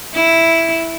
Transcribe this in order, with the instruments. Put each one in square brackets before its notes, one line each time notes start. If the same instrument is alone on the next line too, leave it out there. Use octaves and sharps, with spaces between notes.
[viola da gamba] E4